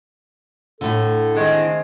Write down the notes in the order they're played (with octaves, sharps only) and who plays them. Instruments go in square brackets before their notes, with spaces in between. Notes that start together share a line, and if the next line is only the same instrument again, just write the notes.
[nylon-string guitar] A2 D3 [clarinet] A4
[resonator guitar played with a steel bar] D#3 G#3 C4